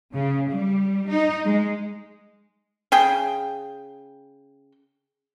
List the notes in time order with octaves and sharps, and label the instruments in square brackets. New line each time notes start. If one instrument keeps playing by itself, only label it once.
[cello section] C#3
G3
D#4
G#3
[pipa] C#3 G#4 G5